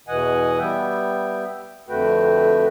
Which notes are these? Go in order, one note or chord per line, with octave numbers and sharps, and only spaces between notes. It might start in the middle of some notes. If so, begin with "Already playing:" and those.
E2 B2 E3 D#5 F#5 G#5
G3 B3 E5 G5
F2 D3 A3 F#4 B4 G5